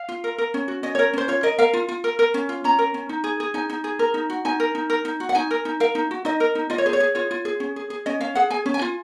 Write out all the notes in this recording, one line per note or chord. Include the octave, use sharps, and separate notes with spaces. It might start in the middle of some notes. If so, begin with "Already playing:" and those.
Already playing: F5
F4
A#4
A#4
C#4
F#4
C#4 D#5
A#4 C#5
C#4 C5
F4 C#5
A#4 D#5
A#4 F5
F4
F4
A#4
A#4
C#4
F4
C#4 A#5
A#4
C#4
D#4
G#4
G#4
D#4 G#5
D#4
G#4
A#4
D#4
F#4
D#4 G#5
A#4
D#4
A#4
D#4
F#4
F#5
D#4 G#5
A#4
D#4
A#4 F5
D#4
F#4
D#4 D#5
A#4
D#4
F4 D#5
C#5
G#4 C5
C#5
G#4
F4 C#5
F4
G#4
C#4
G#4
G#4
C#4 D#5
C#4 F5
G#4 F#5
G#4 G#5
C#4
G#5
F4